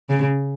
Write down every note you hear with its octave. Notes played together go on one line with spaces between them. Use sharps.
C#3